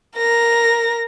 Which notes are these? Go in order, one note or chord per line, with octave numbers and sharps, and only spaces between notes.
A#4 A#6